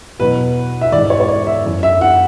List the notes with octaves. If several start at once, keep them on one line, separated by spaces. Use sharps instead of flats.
E2 B2 F#3 B4
E5
G#2 E3 D5
C#5
C#5
D5
E5
F#2 E3
E5
F#5